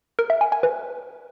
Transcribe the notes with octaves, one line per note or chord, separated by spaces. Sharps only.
A#4
E5
G#5
G#5
B4